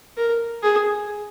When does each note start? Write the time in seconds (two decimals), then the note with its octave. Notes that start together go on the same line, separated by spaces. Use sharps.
0.17 A#4
0.63 G#4